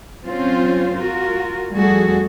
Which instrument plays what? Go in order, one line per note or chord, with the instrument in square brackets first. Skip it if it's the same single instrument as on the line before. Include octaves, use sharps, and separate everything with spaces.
[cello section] F#3 C4 C#4 F4 C5
F4 F#4 A#4
F2 G3 A3 F#4 G#4 A4